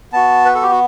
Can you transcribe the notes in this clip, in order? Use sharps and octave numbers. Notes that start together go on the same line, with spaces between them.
B3 F#4 A5
B4
A4
G4
F#4